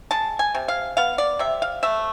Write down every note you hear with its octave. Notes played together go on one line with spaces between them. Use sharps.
G#3 A5
G#5
C3
F5
B3 F5
D5
C3 E5
F5
A3 E5